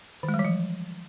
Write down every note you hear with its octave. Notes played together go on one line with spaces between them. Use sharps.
D#3
G#3
G3
E3
F3